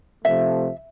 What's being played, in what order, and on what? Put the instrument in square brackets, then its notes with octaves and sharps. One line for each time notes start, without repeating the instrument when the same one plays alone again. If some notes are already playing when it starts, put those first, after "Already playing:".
[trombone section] C3 F3 A3 [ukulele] E5